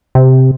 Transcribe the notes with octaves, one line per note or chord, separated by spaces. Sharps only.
C3